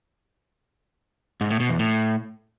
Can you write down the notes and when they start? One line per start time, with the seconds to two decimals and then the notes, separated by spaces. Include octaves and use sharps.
1.41 G#2
1.50 A2
1.60 B2
1.70 E2
1.79 A2